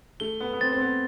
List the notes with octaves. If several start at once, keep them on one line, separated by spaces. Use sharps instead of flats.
A3 G7
B3
B3
C4 A6
C4
B3